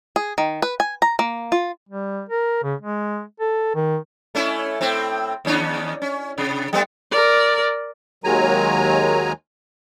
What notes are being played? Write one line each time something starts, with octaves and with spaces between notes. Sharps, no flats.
G#4
D#3
B4
G#5
A#5
A#3
F4
G3
A#4
C#3
G#3
A4
D#3
A3 C#4 E4
A2 C4
D#2 C#4 D4
C#4
C3
G3 A3 B3
A#4 D5
D#2 D#3 F#3 G#3 G#5 A#5